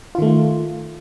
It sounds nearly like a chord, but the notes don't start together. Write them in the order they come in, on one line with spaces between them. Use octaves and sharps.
F4 D#3 A3